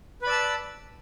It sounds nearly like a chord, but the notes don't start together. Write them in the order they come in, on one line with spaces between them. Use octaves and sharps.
B4 B5 D5 E6 A5